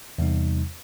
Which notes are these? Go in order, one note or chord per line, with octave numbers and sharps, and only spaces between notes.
E2 C3 G3 D#4